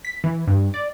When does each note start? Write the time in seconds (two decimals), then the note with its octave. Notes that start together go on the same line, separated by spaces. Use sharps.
0.05 B6
0.24 E3
0.48 G2
0.74 D5